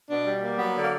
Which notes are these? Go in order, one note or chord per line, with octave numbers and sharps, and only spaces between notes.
B2 D4
G3
A#3
F#3 B3
D3
A#3